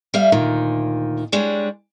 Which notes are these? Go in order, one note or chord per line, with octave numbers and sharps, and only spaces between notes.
G3 E5 F5
D2 A#2 D#3
G3 G#3 D4 C#5